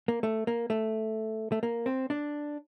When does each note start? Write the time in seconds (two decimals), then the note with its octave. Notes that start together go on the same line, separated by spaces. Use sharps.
0.08 A#3
0.23 A3
0.47 A#3
0.70 A3
1.52 A3
1.63 A#3
1.86 C4
2.10 D4